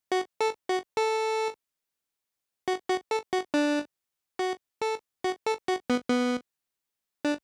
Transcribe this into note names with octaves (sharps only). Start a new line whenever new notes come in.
F#4
A4
F#4
A4
F#4
F#4
A4
F#4
D4
F#4
A4
F#4
A4
F#4
B3
B3
D4